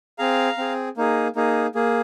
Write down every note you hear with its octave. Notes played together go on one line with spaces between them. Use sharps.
C4 G#4 F5 A#5
C4 G#4
A#3 D#4 G#4
A#3 D#4 G#4
A#3 G#4